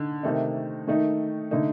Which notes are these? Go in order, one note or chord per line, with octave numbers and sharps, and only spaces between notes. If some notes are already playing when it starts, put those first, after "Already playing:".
Already playing: D3 D#4
C3 D#3 A3 D#4
D#3 A3 D#4
D3 A3 D#4